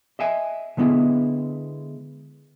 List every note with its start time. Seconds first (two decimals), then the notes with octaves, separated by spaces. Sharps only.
0.19 D#5 E5 G#5
0.77 D3 G#3 B3 E4